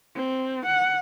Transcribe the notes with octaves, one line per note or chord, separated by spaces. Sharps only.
C4
F#5